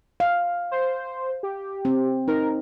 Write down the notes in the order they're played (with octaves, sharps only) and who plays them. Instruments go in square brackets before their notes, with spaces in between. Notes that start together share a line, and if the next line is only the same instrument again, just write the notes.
[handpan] F5
[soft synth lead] C5
G4
[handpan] C4
[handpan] D#4 [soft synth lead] A#4